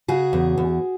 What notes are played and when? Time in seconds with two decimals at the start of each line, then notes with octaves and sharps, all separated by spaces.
0.08 C#3 F#4 G#4
0.33 E2
0.58 E2